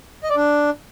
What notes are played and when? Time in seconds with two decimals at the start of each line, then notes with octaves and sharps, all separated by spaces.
0.23 D#5
0.30 D5
0.36 D4